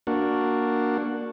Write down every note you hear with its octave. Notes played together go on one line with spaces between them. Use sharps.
A#3 D4 F#4